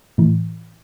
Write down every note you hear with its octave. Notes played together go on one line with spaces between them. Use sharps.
A2 E3